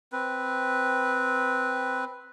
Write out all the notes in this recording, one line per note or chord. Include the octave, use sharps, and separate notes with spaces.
C4 B4